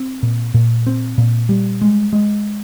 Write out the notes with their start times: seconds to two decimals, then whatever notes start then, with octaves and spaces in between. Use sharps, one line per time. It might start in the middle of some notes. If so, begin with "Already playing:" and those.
Already playing: C4
0.23 A#2
0.54 A#2
0.87 C4
1.18 A#2
1.49 G3
1.81 G#3
2.13 G#3